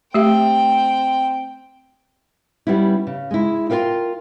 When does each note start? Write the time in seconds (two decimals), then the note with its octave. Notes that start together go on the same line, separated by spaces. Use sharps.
0.14 A3 C4 G4 E5 G5
2.67 G3 B3 C#4 E4
3.07 C#3
3.31 G#3 E4
3.70 F4 G4 A#4 F5 G5